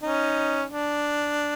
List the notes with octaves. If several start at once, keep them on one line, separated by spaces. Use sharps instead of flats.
C#4 D#4
D4